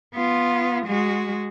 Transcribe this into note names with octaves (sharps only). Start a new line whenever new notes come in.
B3 F4
G#3 F#4